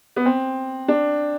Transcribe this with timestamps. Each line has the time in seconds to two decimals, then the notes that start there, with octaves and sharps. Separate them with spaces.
0.16 B3
0.25 C4
0.88 D4